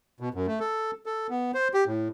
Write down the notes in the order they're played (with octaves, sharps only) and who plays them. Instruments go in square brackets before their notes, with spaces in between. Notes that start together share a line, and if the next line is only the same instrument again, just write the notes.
[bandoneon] B2
F#2
A3
A4
A4
B3
C5
G4
A2